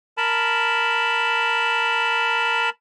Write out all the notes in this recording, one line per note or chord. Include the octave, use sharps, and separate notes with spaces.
A#4 A5 B5